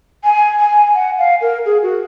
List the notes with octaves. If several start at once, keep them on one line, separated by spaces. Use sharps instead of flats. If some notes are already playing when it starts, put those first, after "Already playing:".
G#5
G#5
F#5
F5
A#4
G#4
F#4